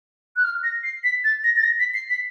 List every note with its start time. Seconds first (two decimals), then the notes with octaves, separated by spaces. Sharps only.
0.36 F#6
0.44 F6
0.63 A#6
0.83 C7
1.04 B6
1.24 A6
1.44 A#6
1.57 A6
1.63 A#6
1.79 B6
1.94 C7
2.10 B6